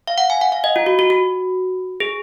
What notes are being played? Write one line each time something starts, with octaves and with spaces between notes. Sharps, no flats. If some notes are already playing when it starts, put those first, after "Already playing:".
F5
F#5
G#5
F#5
F5
D#5
F4
F#4
F#4
F#4
G#4